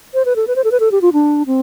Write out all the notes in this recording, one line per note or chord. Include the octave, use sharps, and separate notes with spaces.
C5
B4
A4
B4
C5
A4
B4
A4
G4
F4
D4
C4